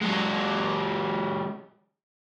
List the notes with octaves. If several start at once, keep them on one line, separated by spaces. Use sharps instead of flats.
F#3 G#3